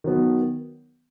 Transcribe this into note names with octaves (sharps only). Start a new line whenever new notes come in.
D#3 F#3 B3